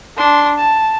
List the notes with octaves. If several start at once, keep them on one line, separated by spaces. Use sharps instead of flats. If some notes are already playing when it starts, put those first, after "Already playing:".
D4 C6
A5